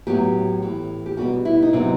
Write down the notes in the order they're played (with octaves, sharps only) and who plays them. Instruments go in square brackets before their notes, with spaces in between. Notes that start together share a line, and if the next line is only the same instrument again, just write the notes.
[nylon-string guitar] A2 F#3 B3 G4
A2 E3 A3
G4
B2 G3 B3 F#4
E4
D#4
C3 F#3 B3 C4